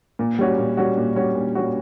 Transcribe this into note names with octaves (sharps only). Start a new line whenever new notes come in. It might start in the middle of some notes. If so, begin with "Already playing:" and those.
A#2
G3 C#4 F#4
A#2
G3 C#4 F#4
A#2
G3 C#4 F#4
A#2
G3 C#4 F#4